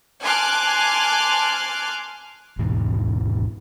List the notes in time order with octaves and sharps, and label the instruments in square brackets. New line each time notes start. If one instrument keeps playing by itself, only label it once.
[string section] G#5 A5 C6 D6 F6 F#6
[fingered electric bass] D#2 G#2 B2 E3